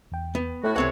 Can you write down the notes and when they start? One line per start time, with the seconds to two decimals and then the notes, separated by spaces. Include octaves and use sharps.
0.12 E2 G5
0.35 B3
0.64 A2 A3 F#4
0.76 C#2 C3 E3 C4 A4 C#5 F#5 C#6